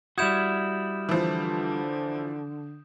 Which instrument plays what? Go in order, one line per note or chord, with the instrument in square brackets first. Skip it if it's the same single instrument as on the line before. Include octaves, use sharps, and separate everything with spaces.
[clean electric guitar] G3 E4 F#4 [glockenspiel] D#6 G6 E7 [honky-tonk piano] G#6
[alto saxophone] D3 [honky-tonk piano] E3 F3